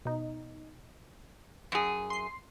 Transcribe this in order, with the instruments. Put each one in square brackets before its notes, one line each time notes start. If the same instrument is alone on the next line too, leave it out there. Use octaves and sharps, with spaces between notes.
[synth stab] B2 D#4
[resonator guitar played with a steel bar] F#2 G#4
[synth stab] C6 C7